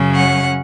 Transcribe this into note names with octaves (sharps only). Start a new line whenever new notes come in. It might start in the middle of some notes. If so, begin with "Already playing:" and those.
Already playing: F#2 C#3 F#3 C#4
F#5